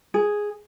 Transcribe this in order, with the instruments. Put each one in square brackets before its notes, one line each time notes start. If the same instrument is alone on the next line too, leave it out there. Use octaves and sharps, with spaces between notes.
[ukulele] G#4